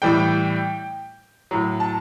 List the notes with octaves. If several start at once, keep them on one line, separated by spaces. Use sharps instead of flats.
A2 E3 G3 G5
A2 F#3
A5